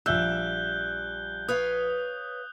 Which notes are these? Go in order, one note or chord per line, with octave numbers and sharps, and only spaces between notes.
A#1 G3 E5 E6 F#6 G6 G7
B4 C#5 F5 D#6 F#6